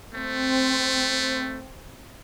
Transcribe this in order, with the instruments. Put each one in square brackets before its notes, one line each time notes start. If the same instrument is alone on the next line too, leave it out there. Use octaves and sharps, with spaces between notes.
[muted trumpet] A3 [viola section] C4